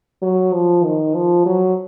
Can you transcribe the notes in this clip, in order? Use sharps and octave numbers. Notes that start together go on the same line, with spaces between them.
F#3
F3
D#3
F3
F#3